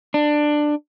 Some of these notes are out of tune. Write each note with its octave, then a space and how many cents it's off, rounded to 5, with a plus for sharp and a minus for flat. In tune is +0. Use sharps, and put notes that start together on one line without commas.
D4 +15